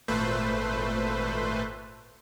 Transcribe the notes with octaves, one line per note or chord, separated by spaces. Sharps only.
G#1 A#2 A3 B4 C5